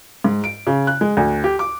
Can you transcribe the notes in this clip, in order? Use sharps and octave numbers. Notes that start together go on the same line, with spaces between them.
G#2
D7
C#3
F#6
G#3
D2
G4
D6